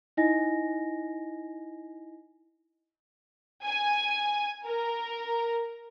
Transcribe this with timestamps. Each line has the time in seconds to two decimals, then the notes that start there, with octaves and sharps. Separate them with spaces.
0.17 D#4 E4 D#5 G#5 A#6
3.66 G#5
4.65 A#4